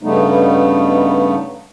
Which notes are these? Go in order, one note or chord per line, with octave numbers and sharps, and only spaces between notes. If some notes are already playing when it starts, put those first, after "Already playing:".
G2 C#3 G3 A3 B3 D#4